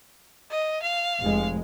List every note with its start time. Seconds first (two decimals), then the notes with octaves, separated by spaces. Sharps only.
0.51 D#5
0.82 F5
1.20 F1 G#3